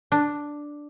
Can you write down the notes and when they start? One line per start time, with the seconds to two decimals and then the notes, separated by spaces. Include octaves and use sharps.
0.12 D4